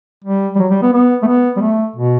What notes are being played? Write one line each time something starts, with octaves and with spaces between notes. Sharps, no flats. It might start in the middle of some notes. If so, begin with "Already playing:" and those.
G3
G3
F#3
G3
B3
B3
A3
B3
G3
A3
B2